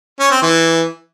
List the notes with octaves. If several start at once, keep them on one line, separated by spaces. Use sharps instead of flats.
C#4
C4
E3